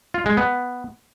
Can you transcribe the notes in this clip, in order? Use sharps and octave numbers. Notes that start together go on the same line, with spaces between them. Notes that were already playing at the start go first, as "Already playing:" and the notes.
F4
G#3
B3